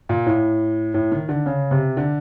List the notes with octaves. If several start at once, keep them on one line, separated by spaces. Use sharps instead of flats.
A#2
A2
A2
D#3
D3
C#3
C3
D3